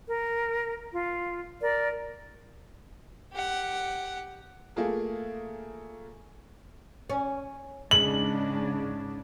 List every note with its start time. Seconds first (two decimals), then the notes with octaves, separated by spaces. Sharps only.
0.08 A#4
0.92 F4
1.61 A#4 D5
3.33 G4 F#5
4.76 A3 A#3 F4 G#4 A#4
7.10 C#4
7.91 G#2 C#3 G#3 D4 F#7